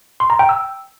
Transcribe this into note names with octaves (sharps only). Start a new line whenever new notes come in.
C6
A#5
G5
E6